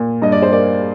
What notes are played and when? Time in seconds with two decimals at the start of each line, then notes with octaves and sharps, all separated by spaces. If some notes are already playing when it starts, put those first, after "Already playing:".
Already playing: A#2
0.22 G2 D#5
0.32 D5
0.42 C5
0.52 A#3 D5